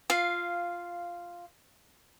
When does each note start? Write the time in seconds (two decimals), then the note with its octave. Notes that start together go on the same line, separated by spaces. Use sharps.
0.10 F4 F5